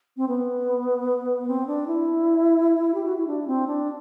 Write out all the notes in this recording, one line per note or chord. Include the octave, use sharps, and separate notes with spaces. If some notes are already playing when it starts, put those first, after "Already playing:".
C4
B3
C4
D4
E4
G4
F#4
E4
D4
C4
D4